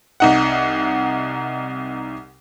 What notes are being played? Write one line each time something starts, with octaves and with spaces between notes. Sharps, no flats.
C2 D#4 F#5